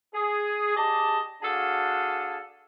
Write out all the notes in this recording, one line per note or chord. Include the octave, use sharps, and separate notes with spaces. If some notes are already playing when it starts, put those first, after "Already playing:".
G#4
G4 G#4 D5 D#5 A5
D4 F#4 G#4 A4 F5 A5